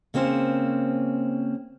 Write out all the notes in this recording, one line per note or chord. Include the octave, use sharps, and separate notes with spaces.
C#3 A#3 C4 C#4 C5